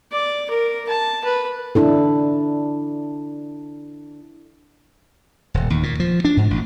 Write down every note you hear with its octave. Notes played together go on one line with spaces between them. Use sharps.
D5
A#4
A5
B4
D4 E4 A4
D#1
D#2
A#2
F3
D4
G#2
A1